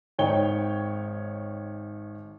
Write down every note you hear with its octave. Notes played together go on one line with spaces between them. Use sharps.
G#1 D#4 C#5 G5 G7